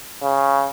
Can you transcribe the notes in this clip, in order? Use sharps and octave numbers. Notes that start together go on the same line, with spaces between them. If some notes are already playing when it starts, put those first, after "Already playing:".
C#3